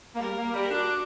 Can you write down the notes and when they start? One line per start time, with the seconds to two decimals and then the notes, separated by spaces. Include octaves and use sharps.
0.15 A#3
0.20 G3 A#4
0.37 A#3
0.54 G3
0.71 D4 F#4